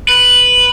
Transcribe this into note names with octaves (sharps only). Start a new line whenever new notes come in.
B4